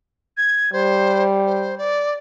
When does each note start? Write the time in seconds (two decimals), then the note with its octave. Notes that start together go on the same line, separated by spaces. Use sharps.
0.37 G#6
0.73 G3 C5
1.46 C5
1.78 D5